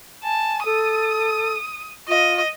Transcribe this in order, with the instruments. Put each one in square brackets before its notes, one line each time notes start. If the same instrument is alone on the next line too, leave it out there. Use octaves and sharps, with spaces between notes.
[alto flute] G#5 [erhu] A5
[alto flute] A4 [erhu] D#6
[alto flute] F4 [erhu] D#5